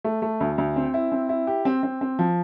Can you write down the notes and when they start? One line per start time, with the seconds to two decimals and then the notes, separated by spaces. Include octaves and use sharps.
0.04 A3
0.22 A3
0.40 D2
0.58 D2
0.76 C4
0.94 E4
1.12 C4
1.29 E4
1.47 G4
1.65 C4
1.83 C4
2.01 C4
2.19 F3